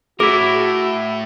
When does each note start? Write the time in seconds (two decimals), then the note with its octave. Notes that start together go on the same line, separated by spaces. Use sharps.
0.20 A2 E4 F#4 G#4 A#4